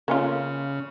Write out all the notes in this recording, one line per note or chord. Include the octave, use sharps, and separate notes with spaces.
C#3 A#3 C#4 F4